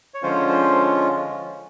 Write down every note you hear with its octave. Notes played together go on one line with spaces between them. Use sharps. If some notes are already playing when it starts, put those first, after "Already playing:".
C#5
D3 F3 G#3 C#4 F4 C5
C5